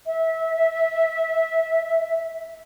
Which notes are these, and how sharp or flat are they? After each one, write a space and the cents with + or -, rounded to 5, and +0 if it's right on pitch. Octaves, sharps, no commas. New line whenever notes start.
E5 -25